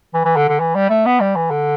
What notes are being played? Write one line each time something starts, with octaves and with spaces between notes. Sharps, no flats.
E3
E3
D3
D3
E3
G3
A3
B3
G3
E3
D3